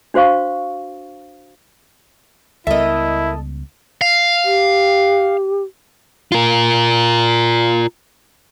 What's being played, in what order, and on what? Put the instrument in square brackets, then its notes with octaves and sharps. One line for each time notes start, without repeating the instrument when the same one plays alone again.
[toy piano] D4 F#4 C5 F5 C#6
[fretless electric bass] C#2 G3 B3 [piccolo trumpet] E4 [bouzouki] A4 D#5 [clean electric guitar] A#4 E5
[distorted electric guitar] F5
[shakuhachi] G4
[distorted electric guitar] F4 A#4